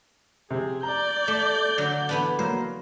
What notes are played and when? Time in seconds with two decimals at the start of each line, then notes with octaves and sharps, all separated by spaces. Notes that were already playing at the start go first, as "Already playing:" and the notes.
0.51 C3 G#4
0.83 D5 A#5 G6
1.28 A3
1.78 D3 F#3
2.09 E3 B3 D4
2.39 F#3 A#3 C5